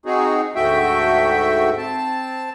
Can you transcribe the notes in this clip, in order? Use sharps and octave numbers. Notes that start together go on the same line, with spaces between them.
C4 D#4 F#4 G#4
D2 G#2 A3 F#4 E5 G5
C4 A5